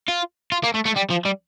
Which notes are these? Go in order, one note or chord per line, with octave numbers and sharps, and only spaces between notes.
F4
F4
A#3
A3
A3
G3
F3
G3